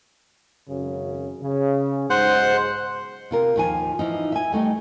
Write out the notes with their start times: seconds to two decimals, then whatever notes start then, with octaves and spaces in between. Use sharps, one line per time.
0.69 G#1 F#2 C#3
1.42 C#3
2.10 B1 G#2 C5 F#5
3.31 C3 F4 A#4
3.56 D#2 F3 G#5
3.99 E3 F3 D#4
4.32 E5 G#5
4.52 G3 A3 D#4 G5